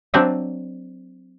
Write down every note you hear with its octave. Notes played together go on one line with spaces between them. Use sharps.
F#3 C4 D4 C5 D5 E5